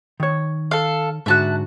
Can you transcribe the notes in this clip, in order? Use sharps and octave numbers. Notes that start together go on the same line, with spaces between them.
D#3 C#5
A4 F5
G#2 D3 F#4 E5 A5 F#6